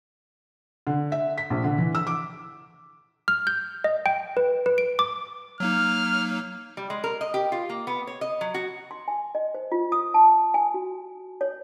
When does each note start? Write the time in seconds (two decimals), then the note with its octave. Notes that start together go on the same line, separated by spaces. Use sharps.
0.87 D3
1.12 E5
1.38 B6
1.50 A#1
1.64 D3
1.78 E3
1.95 E6
2.07 D6
3.28 F6
3.47 G6
3.84 D#5
4.06 G5
4.37 B4
4.66 B4
4.78 D7
4.99 D6
5.60 F#3 A#3 D#4 F6
6.77 G3
6.90 G#3
7.04 A#4
7.21 D#5
7.34 G4
7.52 F4
7.69 A#3
7.87 B3
8.07 C#5
8.21 D#5
8.41 F#3
8.54 F#4
8.91 C6
9.08 G#5
9.35 D#5
9.54 C5
9.72 F4
9.92 D#6
10.14 A5
10.54 G#5
10.74 F#4
11.41 C#5